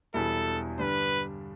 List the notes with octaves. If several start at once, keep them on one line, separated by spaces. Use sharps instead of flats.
E1 E2 B2 G3 E4 A4
G2 D3 G3 D4 B4